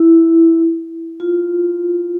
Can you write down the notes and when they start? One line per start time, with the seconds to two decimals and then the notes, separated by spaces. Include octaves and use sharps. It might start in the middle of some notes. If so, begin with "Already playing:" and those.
Already playing: E4
1.20 F4